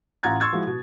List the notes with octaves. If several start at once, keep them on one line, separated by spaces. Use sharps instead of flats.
A1 F4 F#5 A#5 G#6 A6
C6 C#6 E6 G#6 A6
F3 G#3 E4 F#4
B2